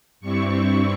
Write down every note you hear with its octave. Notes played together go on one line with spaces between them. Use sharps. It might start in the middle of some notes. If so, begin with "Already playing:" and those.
G2 G3 C4 E4 C#6